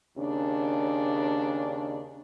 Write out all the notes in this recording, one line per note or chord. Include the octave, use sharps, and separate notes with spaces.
D#2 C#3 D4